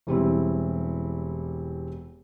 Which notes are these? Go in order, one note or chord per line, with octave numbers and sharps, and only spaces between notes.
E1 G3 C4 E4